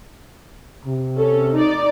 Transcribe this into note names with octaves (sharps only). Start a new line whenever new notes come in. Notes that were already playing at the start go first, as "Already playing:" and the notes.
C3
C#4 A4
D#4 D5